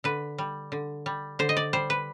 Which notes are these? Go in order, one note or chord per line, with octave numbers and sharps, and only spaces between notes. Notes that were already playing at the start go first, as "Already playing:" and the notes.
D3 B4
G3
D3
G3
D3 C5
D#5
D5
G3 C5
B4